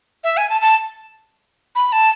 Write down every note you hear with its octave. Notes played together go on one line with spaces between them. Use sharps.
E5
G#5
A5
A5
B5
A5